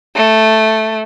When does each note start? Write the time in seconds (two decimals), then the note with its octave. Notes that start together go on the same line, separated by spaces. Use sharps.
0.15 A3